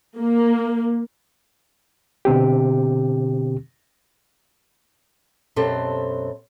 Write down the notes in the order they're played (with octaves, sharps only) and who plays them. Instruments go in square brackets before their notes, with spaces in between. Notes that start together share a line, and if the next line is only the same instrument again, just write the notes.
[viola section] A#3
[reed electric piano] B2 D3 C4 G4
[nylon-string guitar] F#2 B2 C4 G4 A4 C5